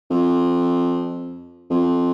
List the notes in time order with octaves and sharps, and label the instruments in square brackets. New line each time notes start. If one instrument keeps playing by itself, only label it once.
[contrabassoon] F2
F2